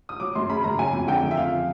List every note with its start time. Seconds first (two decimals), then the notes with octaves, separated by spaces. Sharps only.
0.09 D#6
0.20 F#3 D6
0.35 F#2 C6
0.50 C#3 B5
0.64 F#2 A#5
0.79 F#3 G#5
0.93 F2
1.08 D3 G5
1.23 F2
1.31 E5
1.37 F3 F5